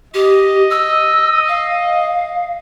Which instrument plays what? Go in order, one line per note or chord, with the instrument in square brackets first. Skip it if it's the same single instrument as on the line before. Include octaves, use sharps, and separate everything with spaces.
[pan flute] G4 [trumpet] D#5
[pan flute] E6
F5